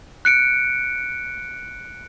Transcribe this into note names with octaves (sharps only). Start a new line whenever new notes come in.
F#6 C#7 D7